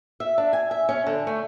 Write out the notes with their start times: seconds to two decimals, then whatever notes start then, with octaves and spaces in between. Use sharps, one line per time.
0.20 E5
0.38 D4
0.53 G#5
0.71 E5
0.89 C#4
1.07 D3
1.27 A3